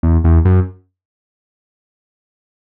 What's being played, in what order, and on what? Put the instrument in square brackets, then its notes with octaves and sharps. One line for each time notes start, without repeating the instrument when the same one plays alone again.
[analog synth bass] E2
E2
F#2